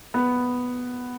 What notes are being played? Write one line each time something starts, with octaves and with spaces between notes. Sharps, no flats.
B3